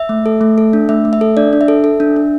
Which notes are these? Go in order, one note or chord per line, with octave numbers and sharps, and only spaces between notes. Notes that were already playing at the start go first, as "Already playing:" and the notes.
Already playing: E5
A3
A4
A3
A4
D4
A3 E5
A3
E5
A4
D4 D5
D4
E5
A4
A4
D4
D4